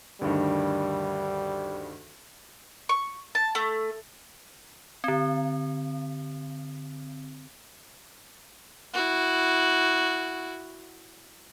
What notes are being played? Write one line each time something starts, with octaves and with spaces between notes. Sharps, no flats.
D2 G2 D#3 G3
C#6
A5
A3
D3 C4
E4 F#4